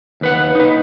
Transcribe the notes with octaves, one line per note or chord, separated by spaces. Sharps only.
D#2 B4 F#5
D#4 B4